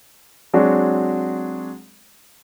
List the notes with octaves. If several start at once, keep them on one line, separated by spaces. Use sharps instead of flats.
F#3 G#3 C4 D4 F#4